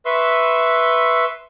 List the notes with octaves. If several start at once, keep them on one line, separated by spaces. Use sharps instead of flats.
B4 E5 C6 C#6 E6